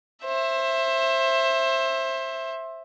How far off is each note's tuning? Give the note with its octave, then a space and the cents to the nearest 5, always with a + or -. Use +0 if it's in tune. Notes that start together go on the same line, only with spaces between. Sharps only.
C5 +25 E5 +5